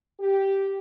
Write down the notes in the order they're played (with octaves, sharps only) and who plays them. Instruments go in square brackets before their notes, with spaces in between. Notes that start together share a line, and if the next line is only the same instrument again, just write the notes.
[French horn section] G4